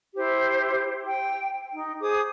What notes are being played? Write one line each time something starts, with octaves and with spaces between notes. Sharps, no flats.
E4 G4 C5
G5
D#4
G#4 C5 D6 D#6